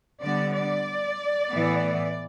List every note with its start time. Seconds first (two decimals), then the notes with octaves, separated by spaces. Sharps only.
0.22 D3 G3 B3 D5
0.54 D5
1.51 A2 E3 B3